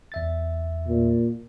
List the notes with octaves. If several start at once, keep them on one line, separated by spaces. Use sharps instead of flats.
E2 E5 A6
A#2